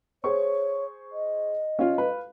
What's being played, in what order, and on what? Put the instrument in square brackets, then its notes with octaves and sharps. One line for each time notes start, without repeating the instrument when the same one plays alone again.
[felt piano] G#4 C5 C#6 [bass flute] C#5
[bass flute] D#5
[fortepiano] C#4 F4 [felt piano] F5
[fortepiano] B4